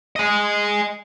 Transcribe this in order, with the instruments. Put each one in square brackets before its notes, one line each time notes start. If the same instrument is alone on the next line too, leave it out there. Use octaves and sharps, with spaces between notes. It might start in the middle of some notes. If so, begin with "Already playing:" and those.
[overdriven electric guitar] D#5 G#5